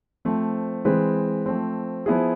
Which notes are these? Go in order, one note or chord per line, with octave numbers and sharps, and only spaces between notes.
F3 A3 C4
E3 G#3 C4 G#4 B4
F3 A3 C4
F3 B3 E4 G#4